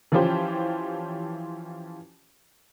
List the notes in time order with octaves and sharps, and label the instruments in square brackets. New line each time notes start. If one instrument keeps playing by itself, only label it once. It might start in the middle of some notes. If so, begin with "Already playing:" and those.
[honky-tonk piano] E3 F3 C#4 F4 G4 C5